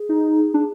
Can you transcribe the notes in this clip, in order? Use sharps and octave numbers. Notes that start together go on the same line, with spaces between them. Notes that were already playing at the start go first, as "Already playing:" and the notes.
Already playing: G#4
D#4
D4